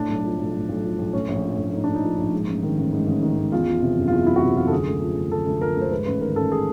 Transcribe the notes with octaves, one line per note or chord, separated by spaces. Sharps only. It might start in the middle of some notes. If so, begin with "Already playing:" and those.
Already playing: A2 D4
B1
F3
B1
A2
B1
F3
B1
A2 C#4
A#1
F3
A#1
A2 D#4
A#1 D4
D#4
F3
A#1
G#2
A1
D#3
A1
G#2
A1
D#3
A1
E2 F4
F3
C3
F#1
F4
E2 E4
F3 E4
F#4
C3 F4
F#1 F4
A4
D3 G#4
D2
F3
D2
D3 A4
D2
F3 A#4
D2 C5
G#2 B4
A1 B4
D#3 A#4
A1 A4
G#4